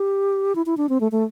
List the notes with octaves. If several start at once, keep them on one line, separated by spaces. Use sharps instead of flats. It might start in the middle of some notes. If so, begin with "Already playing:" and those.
Already playing: G4
E4
E4
D4
C4
A3
A3